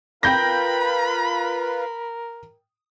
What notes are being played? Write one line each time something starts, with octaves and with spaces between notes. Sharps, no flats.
F4 A#4 B4 G5 B5 G6 A#6